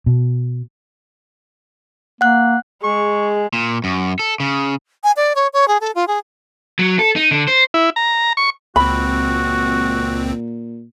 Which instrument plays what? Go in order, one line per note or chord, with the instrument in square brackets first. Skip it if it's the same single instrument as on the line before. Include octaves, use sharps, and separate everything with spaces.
[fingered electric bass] B2
[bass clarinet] A#3 [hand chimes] F#5 F#6
[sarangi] G#3 [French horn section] G#4 [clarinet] C#6
[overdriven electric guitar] A#2
F#2
A4
C#3
[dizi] G#5
D5
C#5
C#5
G#4
A4
F4
G#4
[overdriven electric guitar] F#3
A4
D#4
D3
C5
[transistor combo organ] E4
A#5
C#6
[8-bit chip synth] C#2 C4 [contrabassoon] A#2 [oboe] F#4 [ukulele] B5